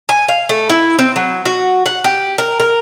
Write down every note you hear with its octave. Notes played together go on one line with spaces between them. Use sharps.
G#5
F5
A3
E4
C4
F#3
F#4
F#5
G4
A#4
A#4